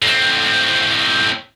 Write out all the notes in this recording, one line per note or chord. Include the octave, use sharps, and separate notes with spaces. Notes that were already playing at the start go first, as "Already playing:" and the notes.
A2 C4